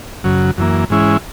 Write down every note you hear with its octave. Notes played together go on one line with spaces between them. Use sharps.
F#2 C#3 F#3
F#2 E3 A#3
G#2 E3 G#3 C#4 E4